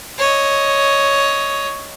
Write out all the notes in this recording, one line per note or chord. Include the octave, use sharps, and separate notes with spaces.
C#5 D#5